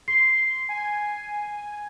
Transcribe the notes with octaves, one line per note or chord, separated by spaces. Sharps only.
C6 C7
G#5